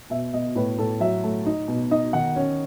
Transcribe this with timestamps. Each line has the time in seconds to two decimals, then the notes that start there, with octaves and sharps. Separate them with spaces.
0.10 B2 E5
0.33 B2 D#5
0.55 A2 B4
0.78 A2 A4
1.00 F#3 E5
1.23 A3
1.46 D#4
1.68 B2
1.91 D#4 D#5
2.13 D#3 F#5
2.36 C#4